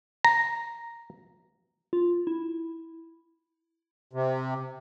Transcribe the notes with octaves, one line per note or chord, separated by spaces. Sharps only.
A#5
F4
E4
C3